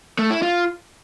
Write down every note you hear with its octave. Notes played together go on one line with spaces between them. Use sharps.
A3
E4
F4